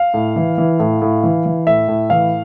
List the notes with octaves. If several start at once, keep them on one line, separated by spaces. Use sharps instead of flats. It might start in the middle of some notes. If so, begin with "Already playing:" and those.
Already playing: F5
A2
E3
E3
A2
A2
E3
E3
A2 E5
A2
E3 F5